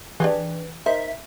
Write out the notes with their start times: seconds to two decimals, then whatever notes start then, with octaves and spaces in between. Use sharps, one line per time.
0.20 E3 D4 G4 G#4
0.86 D#4 A#4 C5 E5